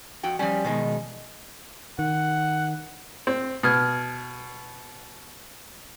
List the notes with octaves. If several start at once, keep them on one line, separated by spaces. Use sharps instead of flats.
F2 F#4 G5
F3 G3 C#4 G#5
B2 D#3 G#3
D#3 F#5
C4
B2 D#6 F6 G#6